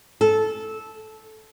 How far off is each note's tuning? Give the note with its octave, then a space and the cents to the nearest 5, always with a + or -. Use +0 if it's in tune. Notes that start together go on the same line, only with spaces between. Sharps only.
A4 -15